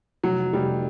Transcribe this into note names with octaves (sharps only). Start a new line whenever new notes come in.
F1 F#3
F1 G3